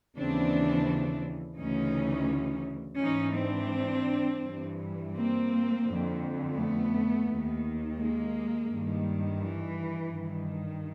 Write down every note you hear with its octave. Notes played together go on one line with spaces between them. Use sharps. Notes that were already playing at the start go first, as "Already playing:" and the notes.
D#2 C#3 E3 C4 D4
D2 C#3 E3 C#4 D#4
G#2 E3 C#4 D#4
C4 D4
G2 E3
A#3 C4
F2 D3
A3 B3
D#2 D#3
G#3 A#3
G2 D#3
E3
G2 D#3